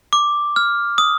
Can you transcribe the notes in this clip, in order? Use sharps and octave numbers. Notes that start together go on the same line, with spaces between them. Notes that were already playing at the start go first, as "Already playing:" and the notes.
D6
F6
D#6